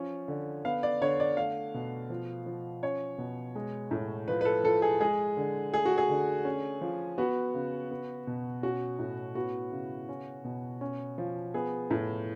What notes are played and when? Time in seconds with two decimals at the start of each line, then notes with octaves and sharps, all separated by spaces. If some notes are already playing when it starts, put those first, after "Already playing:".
Already playing: F3 C#4
0.28 D3
0.65 B3 F5
0.83 D5
1.01 D3 C#5
1.20 D5
1.37 A3 F5
1.74 B2
2.10 F3
2.46 F3
2.83 C#4 C#5
3.18 B2
3.55 G#3
3.91 A2
4.28 F3 B4
4.41 B4
4.45 A4
4.64 F3 A4
4.82 G#4
5.00 G#3 G#4
5.37 D3
5.72 A3 G#4
5.85 F#4
5.98 G#4
6.10 D3
6.45 C#4
6.81 F3
7.18 B3 F#4
7.54 C#3
7.91 B3
8.27 B2
8.63 C#4 F#4
8.99 A2
9.35 B3 F#4
9.72 C#3
10.09 C#4
10.44 B2
10.81 C#4
11.18 F3
11.54 B3 G#4
11.91 A2